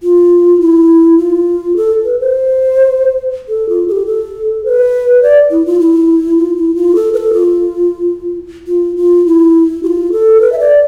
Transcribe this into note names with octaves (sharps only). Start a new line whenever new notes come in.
F4
E4
F4
A4
B4
C5
A4
F4
A4
G4
A4
C5
B4
D5
E4
F4
E4
F4
E4
F4
A4
B4
A4
F4
F4
F4
E4
G4
F4
A4
B4
E5
D5